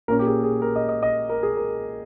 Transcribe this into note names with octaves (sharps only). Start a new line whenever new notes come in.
A#2 A#3 C#4 A#4
G4
G#4
G#4
A#4
D#5
D#5
D#5
A#4
G#4
A#4